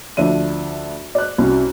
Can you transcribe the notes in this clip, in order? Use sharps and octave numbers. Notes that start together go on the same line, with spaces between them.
D2 F3 D4 E5 D#7
D5 F#6
C2 C#4 F#4